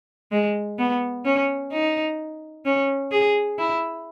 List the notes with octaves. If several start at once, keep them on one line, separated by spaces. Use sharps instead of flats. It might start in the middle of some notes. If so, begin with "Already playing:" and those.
G#3
B3
C#4
D#4
C#4
G#4
E4